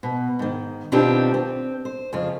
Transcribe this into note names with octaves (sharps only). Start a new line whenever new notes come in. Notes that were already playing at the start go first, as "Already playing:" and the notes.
B2
G#2 D#3
B2 D#3 C4 D4 F4 G4
C4
C5
F2 C#3 F4